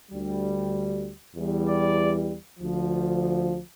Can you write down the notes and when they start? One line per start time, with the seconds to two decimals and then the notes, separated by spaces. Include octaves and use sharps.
0.11 D2 D3 G3
1.35 E2 E3 G3
1.66 D5
2.60 D2 D3 F3